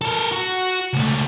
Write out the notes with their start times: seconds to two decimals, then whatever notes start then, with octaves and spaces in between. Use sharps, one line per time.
0.01 A4 A#4
0.31 F#4
0.93 C#2 A3